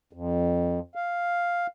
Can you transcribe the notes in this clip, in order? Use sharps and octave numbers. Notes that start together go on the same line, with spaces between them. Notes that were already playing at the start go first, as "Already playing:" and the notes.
F2
F5